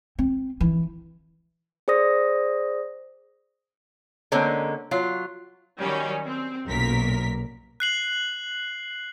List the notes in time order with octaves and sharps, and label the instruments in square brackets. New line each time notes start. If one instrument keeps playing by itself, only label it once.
[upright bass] C4
E3
[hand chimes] G#4 C5 D5 D#6 A#6
[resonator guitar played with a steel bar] D3 G#3 A#3 C4 C#4
F#3 F4
[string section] D#3 F#3 G3 C#4
C4
B1 F#2 A#2 A#4 B6
[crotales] F#6 C7 F#7